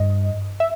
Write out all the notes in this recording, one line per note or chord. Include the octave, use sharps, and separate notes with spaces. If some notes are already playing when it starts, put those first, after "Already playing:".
Already playing: G2 D#5
E5